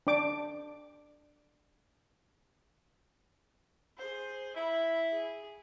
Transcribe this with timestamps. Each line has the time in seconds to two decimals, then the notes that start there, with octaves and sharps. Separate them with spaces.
0.07 D4 D5 D6
3.98 G#4 C5
4.56 E4 E5 B5
5.13 G#4